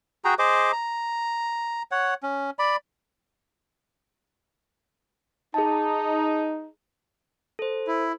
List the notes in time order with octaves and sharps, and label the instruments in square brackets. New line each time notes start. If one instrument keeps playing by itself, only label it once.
[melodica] F#4 G#4 G5 A#5
G#4 C5 D#5 D6
A#5
C#5 F#5
C#4
D5 B5
[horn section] D#4 [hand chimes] G#4 A5
[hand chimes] A4 C5
[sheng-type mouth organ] E4